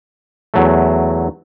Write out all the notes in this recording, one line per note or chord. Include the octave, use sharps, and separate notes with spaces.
E2 F#3 A3